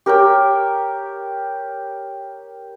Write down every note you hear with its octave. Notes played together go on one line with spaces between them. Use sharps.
G4 A#4 C#5 G5